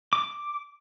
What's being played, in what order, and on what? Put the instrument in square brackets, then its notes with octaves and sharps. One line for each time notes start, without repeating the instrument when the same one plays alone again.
[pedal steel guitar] D6